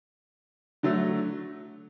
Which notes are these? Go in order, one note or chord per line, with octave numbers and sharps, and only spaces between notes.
D3 F#3 A3